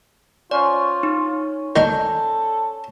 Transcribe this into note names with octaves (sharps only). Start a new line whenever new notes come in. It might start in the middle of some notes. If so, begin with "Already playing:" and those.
C#4 F4 C5 D5
D#4
D#3 A4 D5 C#6 G6